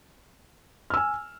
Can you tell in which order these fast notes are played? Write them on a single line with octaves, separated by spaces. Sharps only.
F6 E6 G#5